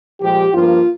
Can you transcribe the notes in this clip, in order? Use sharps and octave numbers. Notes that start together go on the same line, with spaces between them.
A#2 F3 G#3 G4
G2 F3 A#3 F4